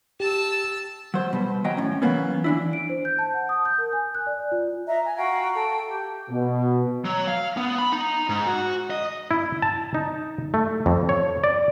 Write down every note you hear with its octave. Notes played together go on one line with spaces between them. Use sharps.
G4 A5 E6
F#3 C5
B2 G3
D#2 F#3 D#5 G5 A#5
A2 C#4
E3 F#3 A#3 B3 C#4
E3 D4 E4
D7
C5
G6
A5
F#5
D#6
G6
A#4
G#5
F#6
D5
F4
D#5 E5 A#5
G#5
F#4 F5 G5 A#5
A4 G5
G4
B2
F#3
F5
B3
B5
D#4
G#2
F#4
D#5
E4
A5
D#4
A3
F2
C#5
D5